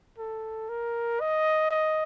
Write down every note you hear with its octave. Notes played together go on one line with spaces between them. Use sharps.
A4
A#4
D#5
D#5